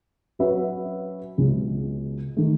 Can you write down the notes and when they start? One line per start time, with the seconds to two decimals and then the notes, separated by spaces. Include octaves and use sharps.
0.39 F#3 C#4 F#4 B4 E5
1.38 C#2 B2 G#3 C#4
2.37 D#3 A3